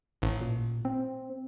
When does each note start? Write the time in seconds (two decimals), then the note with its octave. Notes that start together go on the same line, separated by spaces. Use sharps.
0.22 A1
0.41 A#2
0.85 C4